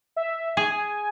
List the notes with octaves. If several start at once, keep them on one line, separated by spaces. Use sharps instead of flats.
E5
G#4 G#5